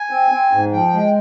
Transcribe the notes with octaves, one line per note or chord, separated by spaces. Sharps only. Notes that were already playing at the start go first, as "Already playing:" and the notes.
Already playing: G#5
C4
C4
G#2
F3 G5
G#3